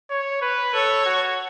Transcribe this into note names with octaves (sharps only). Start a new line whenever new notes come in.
C#5
B4
A4 C#5
F#4